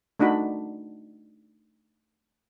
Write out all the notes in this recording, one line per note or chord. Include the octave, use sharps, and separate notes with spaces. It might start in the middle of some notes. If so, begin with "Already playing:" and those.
A3 D4 D#4 F#4 B5